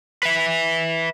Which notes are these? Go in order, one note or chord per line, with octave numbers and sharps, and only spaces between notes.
B4 E5